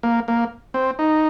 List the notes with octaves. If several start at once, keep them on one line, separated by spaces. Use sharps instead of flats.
A#3
A#3
C4
D#4